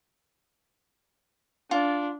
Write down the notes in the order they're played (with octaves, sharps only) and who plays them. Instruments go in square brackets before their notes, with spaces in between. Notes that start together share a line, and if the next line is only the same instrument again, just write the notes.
[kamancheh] D4 [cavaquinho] F4